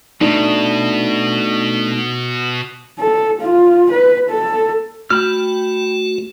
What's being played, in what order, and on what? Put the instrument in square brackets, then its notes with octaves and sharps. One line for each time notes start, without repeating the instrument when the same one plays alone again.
[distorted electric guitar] B2 [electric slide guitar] A3 D4 D#4
[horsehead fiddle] A4
F4
B4
A4
[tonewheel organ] A3 F#4 [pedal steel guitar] G5 B5 F6